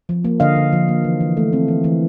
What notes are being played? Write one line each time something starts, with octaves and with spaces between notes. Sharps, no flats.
F3
A#3
D3 D#5 F5
D3
F3
A#3
E3
E3
A3
C4
E3
E3